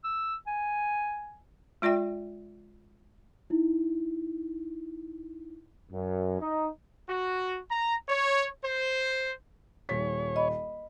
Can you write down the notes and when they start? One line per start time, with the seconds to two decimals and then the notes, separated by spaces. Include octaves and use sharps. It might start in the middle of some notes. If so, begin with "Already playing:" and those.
0.04 E6
0.47 G#5
1.82 G#3 F4 D5 E5 G5
3.50 D#4 E4
5.92 F#2
6.40 D#4
7.09 F#4
7.71 A#5
8.09 C#5
8.64 C5
9.89 D#1 C#5 B6
10.36 D#5 B5